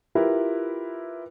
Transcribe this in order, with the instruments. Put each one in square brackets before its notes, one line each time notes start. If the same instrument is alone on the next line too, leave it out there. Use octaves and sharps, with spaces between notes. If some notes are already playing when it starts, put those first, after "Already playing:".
[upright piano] E4 F4 G4 A#4 B4